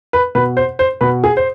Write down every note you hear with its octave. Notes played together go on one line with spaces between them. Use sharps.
B4
B2 B4
C5
C5
B2 B4
G#4
C5